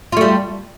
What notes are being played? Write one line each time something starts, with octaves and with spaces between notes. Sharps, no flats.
G3 A3 F4